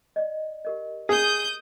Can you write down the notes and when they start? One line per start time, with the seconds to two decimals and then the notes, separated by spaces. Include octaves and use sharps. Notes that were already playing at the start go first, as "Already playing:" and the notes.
0.16 D5 D#5
0.65 G4 A#4 D#5
1.09 G#4 D#6 G6